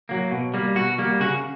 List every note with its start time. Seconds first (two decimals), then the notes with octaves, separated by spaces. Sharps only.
0.09 F#3 A#3
0.32 B2
0.54 G3 A#3
0.76 B2 F#4
0.98 G3 A#3
1.20 C#3 F#4